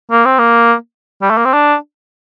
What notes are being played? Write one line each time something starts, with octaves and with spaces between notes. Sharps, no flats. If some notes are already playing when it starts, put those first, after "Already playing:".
A#3
C4
A#3
G3
A3
A#3
C4
D4